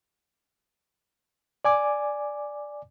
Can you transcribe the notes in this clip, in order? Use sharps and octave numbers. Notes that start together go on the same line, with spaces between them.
D5 G#5 D6